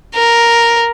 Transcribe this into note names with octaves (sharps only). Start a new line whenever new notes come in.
A#4